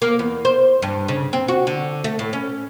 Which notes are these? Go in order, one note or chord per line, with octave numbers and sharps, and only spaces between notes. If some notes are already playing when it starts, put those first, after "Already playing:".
A#3
E2
C5
G2
C#3
C4
F#4
D3
A3
A2
C#4